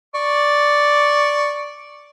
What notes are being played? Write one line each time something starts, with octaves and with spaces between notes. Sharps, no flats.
D5 C#6